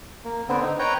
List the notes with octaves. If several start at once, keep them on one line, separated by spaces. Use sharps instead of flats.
A#3
D3 B3 C4
D#4
B4 C#5 G5 A#5